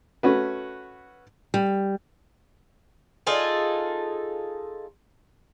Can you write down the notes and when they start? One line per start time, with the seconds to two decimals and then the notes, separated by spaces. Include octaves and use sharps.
0.23 A3 C#4 F#4 B4
1.54 G3
3.27 D#4 F4 G#4 A4